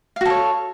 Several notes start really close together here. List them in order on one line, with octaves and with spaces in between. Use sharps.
F5 F#4 A4 C#5